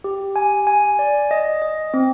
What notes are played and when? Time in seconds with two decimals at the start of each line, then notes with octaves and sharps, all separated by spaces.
0.04 G4
0.36 G#5
0.67 G#5
0.99 D5
1.31 D#5
1.62 D#5
1.94 C4